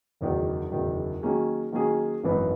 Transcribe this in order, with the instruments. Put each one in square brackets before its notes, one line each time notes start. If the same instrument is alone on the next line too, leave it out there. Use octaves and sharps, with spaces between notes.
[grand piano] F#1 E2 D#3 F#3
F#1 E2 D#3 F#3
D#3 F#3 A#3 C#4 G#4
D#3 F#3 A#3 C#4 G#4
G#1 F#2 E3 B3 D#4